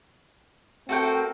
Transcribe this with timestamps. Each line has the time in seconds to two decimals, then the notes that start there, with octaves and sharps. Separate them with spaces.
0.89 A3 C4 F#4 A4 A#4 G5